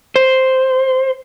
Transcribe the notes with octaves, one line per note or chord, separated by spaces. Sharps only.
C5